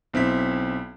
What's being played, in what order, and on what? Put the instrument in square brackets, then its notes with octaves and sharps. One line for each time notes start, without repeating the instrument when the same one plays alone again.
[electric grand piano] B1 C4 E4 B6